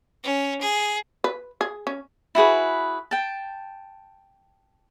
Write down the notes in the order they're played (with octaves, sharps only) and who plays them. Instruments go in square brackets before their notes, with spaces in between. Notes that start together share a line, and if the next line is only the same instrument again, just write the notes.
[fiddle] C#4
G#4
[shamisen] B4
G#4
C#4
[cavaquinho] E4 F#4 G#4 B4
G5 A5